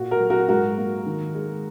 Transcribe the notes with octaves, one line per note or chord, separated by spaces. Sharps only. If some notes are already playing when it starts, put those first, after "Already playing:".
Already playing: A#2 F#4
F#4 A#4
F#3
F#4 A#4
G#2 F#4 A#4
A#3
D#3
G#3